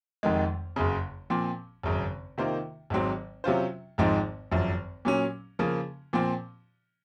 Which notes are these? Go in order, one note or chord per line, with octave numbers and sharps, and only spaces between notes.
F1 F2 D#3 G#3
F#1 F#2 C#3
A#2 F3 C4
G#1 F#2 C#3
C3 D#3 A#3 F4 C5
G#1 G#2 F#3 C4
C3 F#3 C#4 F4 C5
G#1 G#2 F3 C4 D#4
G#1 F#2 F3
A#2 F#3 C#4
C#3 F3 A#3
A#2 F3 C4